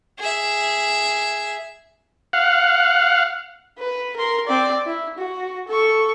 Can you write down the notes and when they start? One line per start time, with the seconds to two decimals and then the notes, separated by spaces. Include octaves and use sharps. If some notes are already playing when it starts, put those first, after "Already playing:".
0.19 G#4 E5
2.33 F5 F#5
3.78 B4
4.16 A#4 C6
4.47 C4 D5
4.86 E4
5.18 F#4
5.68 A4 C#6